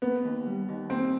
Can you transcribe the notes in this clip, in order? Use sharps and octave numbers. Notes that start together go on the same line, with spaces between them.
A#3 B3
D#2
G3
D#2
A#3 C4